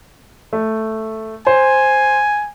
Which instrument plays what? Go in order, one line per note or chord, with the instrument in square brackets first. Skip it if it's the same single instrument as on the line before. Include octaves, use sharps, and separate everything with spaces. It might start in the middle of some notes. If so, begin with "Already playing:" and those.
[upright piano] A3
[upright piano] C5 [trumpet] G#5